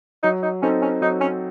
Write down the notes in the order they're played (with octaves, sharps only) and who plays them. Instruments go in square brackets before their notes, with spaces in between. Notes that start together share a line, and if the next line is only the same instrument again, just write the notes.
[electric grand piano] F#3 [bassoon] D#4
[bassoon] D#4
[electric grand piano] C4 D#4 A4 C5 [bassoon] C#4
[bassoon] C#4
[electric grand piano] F#3 [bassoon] D#4
[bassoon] C#4